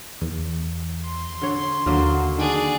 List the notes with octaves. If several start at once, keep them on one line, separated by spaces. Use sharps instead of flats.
E2
C6
D3 C#5
D#2 D3 F#3 A#3
D#3 D4 G#4